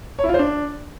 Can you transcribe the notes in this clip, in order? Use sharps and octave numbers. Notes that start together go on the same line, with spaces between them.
C#5
E4
F4
C5
D4